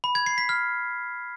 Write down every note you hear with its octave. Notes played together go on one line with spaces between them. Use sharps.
B5
G#6
C7
B6
F6